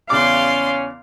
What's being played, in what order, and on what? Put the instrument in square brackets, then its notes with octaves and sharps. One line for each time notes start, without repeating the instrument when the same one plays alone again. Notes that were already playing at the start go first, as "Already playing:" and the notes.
[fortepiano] E2 C#3 D6 [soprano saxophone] C#4 [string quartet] D5 C6 [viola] F5